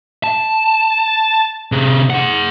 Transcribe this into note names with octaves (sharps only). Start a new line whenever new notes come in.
A5
C3 G#4
G#4 F#5